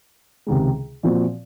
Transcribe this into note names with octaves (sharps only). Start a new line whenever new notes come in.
C#2 C3 D#3 G#3
A#2 F3 C4 F#4